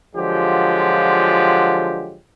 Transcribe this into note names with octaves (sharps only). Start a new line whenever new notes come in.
D3 F3 F#3 G#3 F4 G4